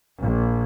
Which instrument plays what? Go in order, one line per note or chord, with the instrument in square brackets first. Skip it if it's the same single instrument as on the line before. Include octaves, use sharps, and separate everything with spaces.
[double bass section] A#1